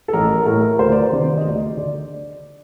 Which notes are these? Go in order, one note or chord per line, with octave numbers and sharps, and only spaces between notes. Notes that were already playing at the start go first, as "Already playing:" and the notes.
A4
A1 A#4
A2 A#4
D2 C5
D5
C5
C3 D#3
D#5
D2 D5
D3 D5